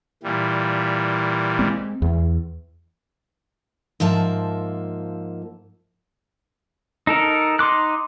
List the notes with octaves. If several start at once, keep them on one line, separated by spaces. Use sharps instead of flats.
A#2 E3 G3
G#3 C4
E2
G#2 F3 A#3 E5 A5
D#4 A4 A#4
D#4 C6 D6 F#6